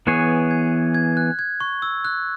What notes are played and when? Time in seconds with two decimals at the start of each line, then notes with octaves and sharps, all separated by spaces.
0.07 E3 B3 G#4 C#5 F#6
0.51 G#6
0.95 G#6
1.17 F#6
1.39 G#6
1.60 C#6
1.82 E6
2.05 F#6